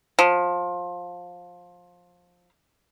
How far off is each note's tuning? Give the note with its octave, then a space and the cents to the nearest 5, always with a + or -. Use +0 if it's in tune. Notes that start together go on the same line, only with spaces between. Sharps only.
F3 +20